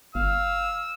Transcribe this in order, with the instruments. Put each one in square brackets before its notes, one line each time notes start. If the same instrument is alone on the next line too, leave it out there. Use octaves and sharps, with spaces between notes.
[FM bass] G1 [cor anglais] F5 [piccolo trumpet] E6